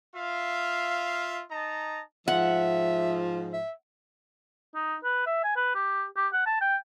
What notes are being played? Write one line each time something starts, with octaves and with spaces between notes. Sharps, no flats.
F4 E5 F5
D#4 D#5 A5 A#5
G#2 F3 E5 F#5
E5
D#4
B4
E5
G#5
B4
G4
G4
F#5
A5
G5